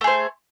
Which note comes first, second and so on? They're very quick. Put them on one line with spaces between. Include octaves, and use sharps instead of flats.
A3 G#4 C5